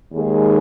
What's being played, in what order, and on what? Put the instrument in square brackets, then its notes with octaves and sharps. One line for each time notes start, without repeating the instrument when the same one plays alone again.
[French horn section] D#2 D#3 G#3 G#4